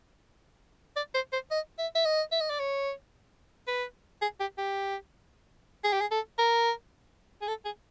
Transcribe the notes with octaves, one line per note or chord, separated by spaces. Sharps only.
D5
C5
C5
D#5
E5
E5
D#5
E5
D#5
D5
C#5
B4
G#4
G4
G4
G#4
G4
G#4
A4
A#4
G#4
A4
G#4